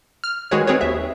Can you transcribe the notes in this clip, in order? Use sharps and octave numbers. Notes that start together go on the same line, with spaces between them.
F6
D#3 G#3 F#4 G#4 B4 C#5
C4 G#4 B4 C#5
D#2 E5